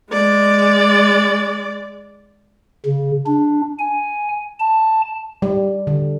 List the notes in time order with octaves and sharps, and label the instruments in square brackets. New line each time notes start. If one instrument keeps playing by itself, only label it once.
[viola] G#3 D5
[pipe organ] C#3
D4
G#5
A5
[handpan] G3
D3